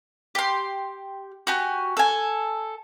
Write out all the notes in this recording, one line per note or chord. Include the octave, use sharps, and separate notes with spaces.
G4 C6
F#4 G4 G#5
A4 G#5